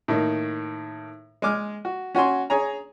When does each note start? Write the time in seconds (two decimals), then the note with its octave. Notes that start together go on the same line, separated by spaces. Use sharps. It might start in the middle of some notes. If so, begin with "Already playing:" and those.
0.08 A2 D#3 A#3
1.42 G#3 G#5 D6 F6
1.85 F#4
2.15 C#4 F#4 G#5 C6
2.50 G#4 C#5 G#5 A#5